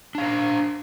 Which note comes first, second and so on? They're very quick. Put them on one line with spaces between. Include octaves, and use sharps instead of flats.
D4 F5 C5